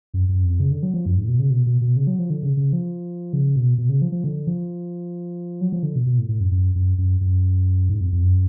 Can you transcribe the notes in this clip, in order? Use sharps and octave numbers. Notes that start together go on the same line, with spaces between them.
F#2
F#2
F2
C#3
D3
F#3
F3
F#2
G#2
A2
B2
C#3
B2
B2
B2
C#3
F#3
F3
D3
C#3
C#3
F3
C#3
B2
B2
C#3
F3
F3
D3
F3
F#3
F3
D3
B2
B2
A2
A2
F#2
F#2
F#2
F#2
F#2
G#2
F2
F2
F#2